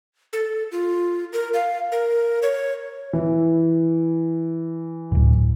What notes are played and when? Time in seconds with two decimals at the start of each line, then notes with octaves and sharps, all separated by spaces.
0.33 A4
0.72 F4
1.33 A#4
1.54 F5
1.92 A#4
2.42 C#5
3.13 E3
5.12 D1 G1